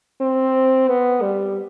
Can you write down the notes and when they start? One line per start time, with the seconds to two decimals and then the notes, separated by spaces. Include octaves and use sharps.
0.21 C4
0.89 B3
1.22 G3